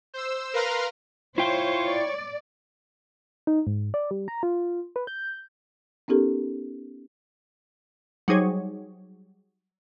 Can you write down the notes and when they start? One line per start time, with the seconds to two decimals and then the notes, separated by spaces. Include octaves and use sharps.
0.14 C5 E6
0.53 A#4 B4 F5 A#5 C6 F6
1.38 E4 F4 C5 C#5 G5 C#6
1.85 D5
3.47 D#4
3.67 G#2
3.94 D5
4.11 G3
4.28 A#5
4.43 F4
4.96 B4
5.07 G6
6.08 B3 C#4 D#4 G4 A4 A#4
8.28 F#3 G3 D#4 G#4 C5 C#5